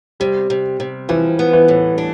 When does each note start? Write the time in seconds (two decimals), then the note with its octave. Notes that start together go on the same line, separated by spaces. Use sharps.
0.20 C3 G3
0.50 C3
0.80 C3
1.09 E3 F3
1.39 B3
1.53 E3
1.68 A2
1.98 D4